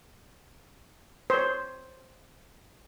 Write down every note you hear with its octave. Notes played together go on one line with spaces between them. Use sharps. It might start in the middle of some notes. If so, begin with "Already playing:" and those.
C5 C#5